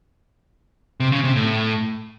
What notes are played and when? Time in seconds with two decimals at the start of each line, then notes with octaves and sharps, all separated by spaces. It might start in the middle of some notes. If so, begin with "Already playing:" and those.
1.00 C3
1.12 C#3
1.24 C3
1.36 A2